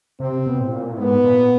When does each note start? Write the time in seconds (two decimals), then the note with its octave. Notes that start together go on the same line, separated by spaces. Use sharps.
0.20 C3 C4
0.46 B2
0.60 A2
0.72 A#2
0.91 A2
0.98 G#2 B3
1.24 A#2